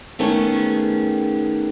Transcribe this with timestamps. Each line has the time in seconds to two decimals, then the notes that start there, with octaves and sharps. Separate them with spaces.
0.19 D#3 A3 B3 C#4 G#4